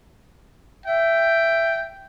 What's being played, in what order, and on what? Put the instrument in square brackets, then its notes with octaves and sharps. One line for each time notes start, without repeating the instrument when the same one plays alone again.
[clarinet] E5 [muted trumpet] G5